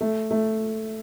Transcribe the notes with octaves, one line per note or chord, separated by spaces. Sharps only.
A3
A3